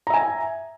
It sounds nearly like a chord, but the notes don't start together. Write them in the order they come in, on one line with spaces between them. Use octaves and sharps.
A#5 E5 G#5